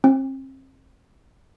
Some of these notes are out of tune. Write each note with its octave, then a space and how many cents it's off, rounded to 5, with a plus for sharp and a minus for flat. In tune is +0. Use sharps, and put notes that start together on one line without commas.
C4 +40